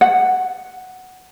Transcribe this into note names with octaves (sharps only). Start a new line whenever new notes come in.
F#5